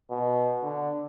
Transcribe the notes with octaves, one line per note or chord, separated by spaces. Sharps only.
B2
D3